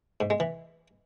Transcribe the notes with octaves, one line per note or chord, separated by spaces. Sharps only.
G#2
G#3
E3